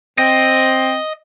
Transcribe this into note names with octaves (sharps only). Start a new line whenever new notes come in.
C4 D#5